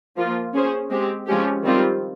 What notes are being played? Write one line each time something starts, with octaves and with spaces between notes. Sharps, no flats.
F3 A#3 F4
C#4 G#4 C5
G#3 C4 G4
F3 G#3 C#4 G4
D#3 G3 C4 F4